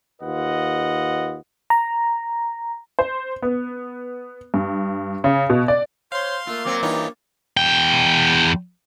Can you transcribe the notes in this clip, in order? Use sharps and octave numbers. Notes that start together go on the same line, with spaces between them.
D#2 F4 B4 D#5 F#5
A#5
C5
B3
G2
C#3
B2
D5
C5 C#5 F5 C6
A3 A#3 F4
F#3 C4 D5
G2 E3 D#4 F4 C#5
E2 G5